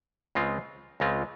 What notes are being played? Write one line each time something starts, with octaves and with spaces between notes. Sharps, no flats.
C#2 C#3 G#3 C4 F4
C#2 C#3 G#3 C4 F4